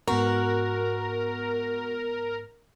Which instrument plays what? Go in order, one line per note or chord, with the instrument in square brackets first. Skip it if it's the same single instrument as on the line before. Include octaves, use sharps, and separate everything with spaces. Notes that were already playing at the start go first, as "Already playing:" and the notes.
[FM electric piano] G#2 B3 A#5 [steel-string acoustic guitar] F#4 [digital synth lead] A#4